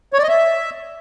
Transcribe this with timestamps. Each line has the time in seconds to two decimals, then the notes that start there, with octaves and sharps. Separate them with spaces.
0.13 C#5
0.18 D5
0.23 D#5
0.28 E5